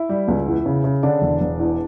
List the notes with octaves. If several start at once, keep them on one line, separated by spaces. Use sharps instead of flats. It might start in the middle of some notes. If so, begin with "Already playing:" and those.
Already playing: E4
G3
C#2
E2
C#3
C#3
D3 D4
E1
E1
E2